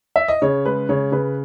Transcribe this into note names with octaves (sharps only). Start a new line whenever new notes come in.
E5
D#5
C#3 C#5
G#3 B4
C#3 C#5
C#3 B4